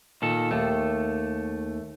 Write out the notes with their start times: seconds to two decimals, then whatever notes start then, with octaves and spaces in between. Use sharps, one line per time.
0.22 A#2 D#3 A4
0.51 D#2 A3